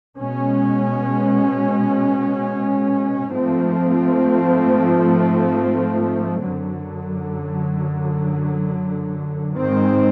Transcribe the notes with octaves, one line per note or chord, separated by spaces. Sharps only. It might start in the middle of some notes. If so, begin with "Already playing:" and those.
B2 G#3 C#4
G#2 F3 A3 C4
F#2 D3 F#3
G#2 D#3 G#3 C4